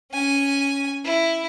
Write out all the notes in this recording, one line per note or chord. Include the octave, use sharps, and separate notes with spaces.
C#4 G#5
E4